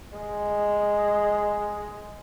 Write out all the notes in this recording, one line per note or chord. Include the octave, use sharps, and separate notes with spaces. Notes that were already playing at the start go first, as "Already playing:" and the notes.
G#3